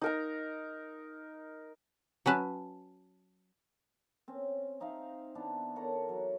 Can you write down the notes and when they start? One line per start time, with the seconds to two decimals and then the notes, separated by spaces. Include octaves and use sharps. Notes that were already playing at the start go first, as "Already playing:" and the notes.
0.01 D#4 A#4 A#5
2.26 F#3 C#4 B4 A5
4.28 C4 C#4
4.80 C4 D#4 E5 F5
5.35 E3 B3 D4
5.76 A4 A#4 C#5 F#5
6.09 F#3